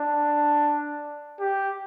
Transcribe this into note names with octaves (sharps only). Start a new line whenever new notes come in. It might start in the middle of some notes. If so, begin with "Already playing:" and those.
Already playing: D4
G4